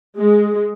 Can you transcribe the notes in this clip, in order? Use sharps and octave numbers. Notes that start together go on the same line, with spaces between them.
G#3